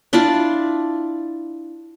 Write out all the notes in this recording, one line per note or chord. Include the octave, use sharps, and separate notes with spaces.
D4 E4 F4 D5